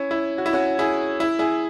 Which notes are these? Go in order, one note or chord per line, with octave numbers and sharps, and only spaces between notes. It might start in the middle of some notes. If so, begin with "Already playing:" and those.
Already playing: C#4 E4
E4
F#4
E4
C#4 F#4
E4 G#4
E4
E4 G#4